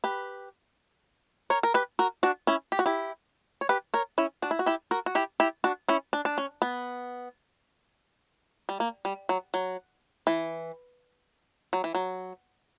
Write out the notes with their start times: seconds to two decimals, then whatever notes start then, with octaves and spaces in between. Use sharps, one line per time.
0.04 G4 B4
1.50 A#4 C#5
1.63 A#4
1.74 G4 B4
1.99 F#4 A#4
2.23 D4 F#4
2.47 C#4 E4
2.72 G4
2.79 F#4
2.86 E4 G4
3.61 C#5
3.69 G4 B4
3.94 A#4 C#5
4.18 C#4 E4
4.42 D4 F#4
4.51 E4
4.59 F#4
4.66 E4 G4
4.91 F#4 A#4
5.06 F#4
5.15 E4 G4
5.40 E4 G4
5.64 D4 F#4
5.88 C#4 E4
6.13 D4
6.25 D4
6.38 C#4
6.62 B3
8.69 G3
8.80 A#3
9.05 G3
9.29 F#3
9.54 F#3
10.27 E3
11.73 F#3
11.84 E3
11.95 F#3